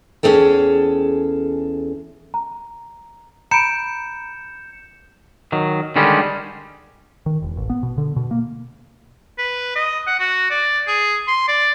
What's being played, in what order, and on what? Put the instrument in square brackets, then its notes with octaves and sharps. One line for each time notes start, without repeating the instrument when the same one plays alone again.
[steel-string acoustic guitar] E2 G#2 C#4 G#4 A4 G5
[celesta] A#5
[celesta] A#5 B5 D7 [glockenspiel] G6 C#7 E7
[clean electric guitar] D#3 F#3
D3 D#3 G3 G#3 C#4
[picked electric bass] D#3
E1
A1
B3
B2
D3
B2
A#3
[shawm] B4
D#5
F#5
F#4
D5
G#4
C6
D5